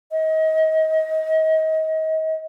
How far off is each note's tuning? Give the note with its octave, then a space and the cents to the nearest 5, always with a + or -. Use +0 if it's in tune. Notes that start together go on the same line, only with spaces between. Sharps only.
D#5 +30